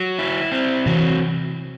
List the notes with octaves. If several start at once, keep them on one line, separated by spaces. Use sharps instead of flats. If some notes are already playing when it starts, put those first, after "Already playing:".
Already playing: F#3
E4
C4
C3 E3 F#3